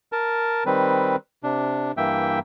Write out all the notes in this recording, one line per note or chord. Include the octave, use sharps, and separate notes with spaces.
A#4 A5
D#3 G3 C4 B4
C3 D4
G2 E3 A#3 E5 G5